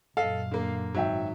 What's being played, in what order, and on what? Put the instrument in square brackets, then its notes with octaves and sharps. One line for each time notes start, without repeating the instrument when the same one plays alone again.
[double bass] F#2 A#2 [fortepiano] A4 D#5 [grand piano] F5
[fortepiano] D3 A#3
[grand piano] G#1 E5 G5 [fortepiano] F#3